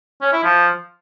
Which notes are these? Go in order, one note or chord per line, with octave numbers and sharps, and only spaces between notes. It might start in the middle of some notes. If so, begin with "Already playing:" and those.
C#4
E4
F3